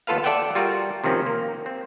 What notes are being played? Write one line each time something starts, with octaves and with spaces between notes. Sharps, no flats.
D#2 B3 F4 A4 B4 F5
A4 D5 E5 F#5 G5
G3 F4 F#4 A#4
C3 D#3 F3 C4 C#4
A#3
C4